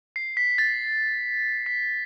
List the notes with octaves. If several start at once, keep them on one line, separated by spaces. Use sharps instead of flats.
C7
B6
A6
B6